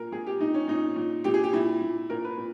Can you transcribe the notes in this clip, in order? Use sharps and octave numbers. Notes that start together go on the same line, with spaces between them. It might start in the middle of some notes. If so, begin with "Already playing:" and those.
Already playing: A#2 A#4
A#2 G#4
G4
A#2 D#4
C#4
A#2 D#4
A#2
A#2 G4
G#4
G4
A#2 E4
A#2
A#2 A#4
B4
A#2